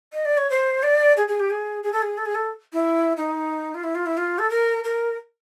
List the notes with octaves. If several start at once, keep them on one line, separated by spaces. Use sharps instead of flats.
D#5
D5
C#5
C5
D5
G#4
G#4
G4
G#4
G#4
A4
G#4
A4
G#4
A4
E4
D#4
F4
E4
F4
E4
F4
A4
A#4
A#4